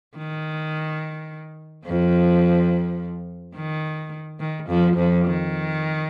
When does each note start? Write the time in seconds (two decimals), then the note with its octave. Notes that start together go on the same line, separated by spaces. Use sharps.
0.17 D#3
1.86 F2 F3
3.55 D#3
4.40 D#3
4.68 F2 F3
4.97 F2 F3
5.26 D#3